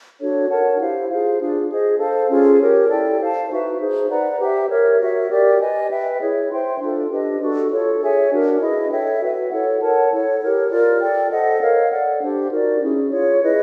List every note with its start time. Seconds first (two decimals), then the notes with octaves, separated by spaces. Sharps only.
0.19 D4 F#4 A4 C#5
0.49 A#4 C#5 F#5 A5
0.78 E4 G4 C5 F5
1.09 F4 G#4 C5 F5
1.40 D4 F4 G#4
1.68 G#4 C5 D#5
1.98 A4 C5 F5
2.29 C#4 F4 G#4
2.59 G4 A#4 C#5
2.89 E4 A4 D5 G5
3.19 C5 F5 A5
3.49 D#4 F#4 B4 E5
3.79 D#4 G#4 C5
4.09 B4 D5 F#5 A#5
4.40 G4 C5 E5
4.69 A#4 C#5 E5
5.00 F#4 A#4 C#5 E5
5.29 G4 A#4 D5
5.60 B4 D#5 G#5
5.90 B4 E5 G5
6.19 E4 G#4 C#5
6.50 C5 E5 G5 C6
6.80 D4 F4 A4
7.10 D4 G4 B4 D#5
7.40 D4 F#4 A4
7.70 F4 A4 C#5
8.00 G#4 C#5 E5 G#5
8.31 D4 F#4 A#4
8.60 E4 G#4 B4 D#5
8.90 A4 C#5 E5 G5
9.20 F#4 B4 E5
9.51 E4 A4 C#5 F#5
9.80 A#4 C#5 F#5 A5
10.11 E4 A4 C#5
10.40 G4 A#4 C#5
10.71 F4 A#4 D5
11.00 A4 D5 G5
11.30 A4 C5 D#5 F#5
11.60 A#4 C#5 F5
11.91 A4 D5 F#5
12.20 D4 G4 C5
12.50 D#4 F#4 A#4 D5
12.80 C#4 E4 G#4
13.10 F4 G#4 C#5
13.41 E4 G#4 B4 D#5